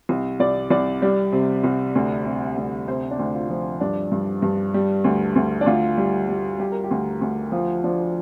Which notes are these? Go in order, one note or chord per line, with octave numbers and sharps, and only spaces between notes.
C2
C2 D5
C2 D5
G3 D5
C3
C2
D2
C3
D2
C3 C5
D4
D2
F4
F3
G2 D4
G2
G2
G3
D2
D2
D4
D2 F4
G3
G3
G3 G4
A#4
G4
D2
D2
F3 F4
F3 D4